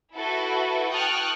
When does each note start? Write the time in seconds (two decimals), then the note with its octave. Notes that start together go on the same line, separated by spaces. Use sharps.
0.15 E4 F#4 A4 B4
0.91 G5 A5 C#6 D#6 F6 F#6